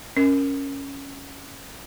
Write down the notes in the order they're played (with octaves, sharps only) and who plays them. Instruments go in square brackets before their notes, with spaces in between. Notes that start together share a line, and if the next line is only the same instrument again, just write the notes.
[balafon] C#4 A#4